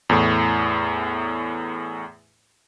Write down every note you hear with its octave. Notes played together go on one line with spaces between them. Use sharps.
E2 A2